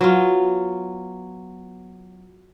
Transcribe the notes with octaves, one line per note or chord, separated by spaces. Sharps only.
F#3 B3 F4